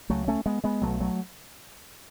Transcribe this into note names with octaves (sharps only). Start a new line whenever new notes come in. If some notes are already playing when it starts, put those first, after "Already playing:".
C#2 C#3 F#3 A3
A3 C#4
G#3 B3
G#3 B3
B1 B2 F#3 A3
F#3 A3